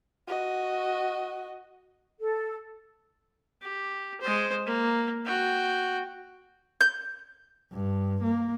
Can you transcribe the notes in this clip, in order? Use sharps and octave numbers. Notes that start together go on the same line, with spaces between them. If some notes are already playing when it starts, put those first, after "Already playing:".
F#4 D#5
A4
G4
G#3 C5
A#3
F#4 G5
G6
G2
A#3